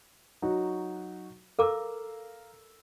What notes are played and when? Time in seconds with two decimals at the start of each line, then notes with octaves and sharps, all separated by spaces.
0.42 F#3 D#4 F#4
1.59 A4 A#4 F5 A#5 D6 E6